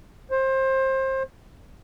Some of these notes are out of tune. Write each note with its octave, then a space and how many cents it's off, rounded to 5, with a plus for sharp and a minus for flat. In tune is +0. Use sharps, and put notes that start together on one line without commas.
C5 +25